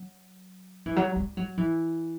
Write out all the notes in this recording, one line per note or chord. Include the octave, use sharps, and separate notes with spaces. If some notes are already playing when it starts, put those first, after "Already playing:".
Already playing: F#3
E3
F#3
G3
F#3
E3